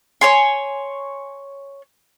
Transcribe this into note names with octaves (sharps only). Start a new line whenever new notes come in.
C#5 G#5 C6